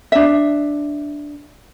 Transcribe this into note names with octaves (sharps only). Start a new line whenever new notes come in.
D4 E5